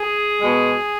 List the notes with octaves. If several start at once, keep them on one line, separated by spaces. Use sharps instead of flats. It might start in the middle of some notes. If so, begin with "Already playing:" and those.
Already playing: G#4
B2 G#3